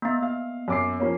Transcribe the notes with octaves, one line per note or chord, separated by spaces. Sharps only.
A#3 B3 F5 A#5
F5
F#2 D6 C7
F3 A#3 C#4